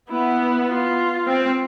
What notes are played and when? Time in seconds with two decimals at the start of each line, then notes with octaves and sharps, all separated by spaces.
0.10 B3 E4
0.69 F4
1.26 C4